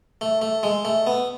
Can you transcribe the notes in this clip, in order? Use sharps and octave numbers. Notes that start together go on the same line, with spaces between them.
A3
A3
G#3
A3
B3